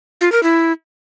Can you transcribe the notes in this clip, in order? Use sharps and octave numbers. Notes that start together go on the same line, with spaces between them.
F4
A#4
E4